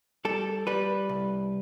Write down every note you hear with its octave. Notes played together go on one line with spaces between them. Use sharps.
G3 A4
G3 B4
C2